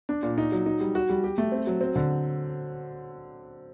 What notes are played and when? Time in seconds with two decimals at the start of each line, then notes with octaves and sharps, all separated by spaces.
0.09 D4
0.23 A#2
0.38 D#4
0.52 F#3
0.66 D#4
0.80 G3
0.95 F#4
1.09 G3
1.24 G4
1.38 A3
1.52 C4
1.67 F#3
1.81 C4
1.96 D3